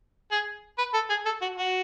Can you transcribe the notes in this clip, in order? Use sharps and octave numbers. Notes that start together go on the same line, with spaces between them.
G#4
B4
A4
G#4
A4
F#4
F#4